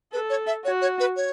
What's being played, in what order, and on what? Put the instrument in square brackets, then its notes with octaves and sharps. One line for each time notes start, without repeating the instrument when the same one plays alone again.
[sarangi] A4 [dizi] B4
[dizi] C#5
E5
[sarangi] F#4 [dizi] C#5
[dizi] C#5
B4
C#5